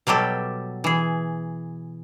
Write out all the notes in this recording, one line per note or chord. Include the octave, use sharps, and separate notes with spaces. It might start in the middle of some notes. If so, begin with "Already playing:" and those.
B2 F#3 G3 G4 A4
E3 G#4